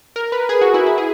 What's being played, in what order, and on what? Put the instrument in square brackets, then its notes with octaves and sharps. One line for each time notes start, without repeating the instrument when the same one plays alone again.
[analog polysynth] A#4
B4
G#4
F#4
E4
E4
G#4